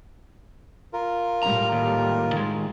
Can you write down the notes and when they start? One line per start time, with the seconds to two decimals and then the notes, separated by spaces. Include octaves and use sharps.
0.93 F4 A#4
1.43 A2 G3 A#5
1.72 D#2
2.33 D#3 G#3